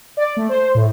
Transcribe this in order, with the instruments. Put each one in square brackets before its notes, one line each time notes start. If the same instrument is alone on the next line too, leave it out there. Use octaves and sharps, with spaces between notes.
[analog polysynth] D5
A3
C5
A2